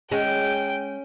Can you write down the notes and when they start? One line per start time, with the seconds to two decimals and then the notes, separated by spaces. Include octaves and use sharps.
0.11 G#3 C#4 E5 G5